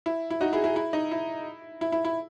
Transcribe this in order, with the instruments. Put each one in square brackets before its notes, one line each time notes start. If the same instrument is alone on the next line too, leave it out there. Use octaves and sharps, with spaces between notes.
[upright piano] E4
E4
D#4 F#4
E4 G#4
E4 G#4
E4
D#4
E4
E4
E4
E4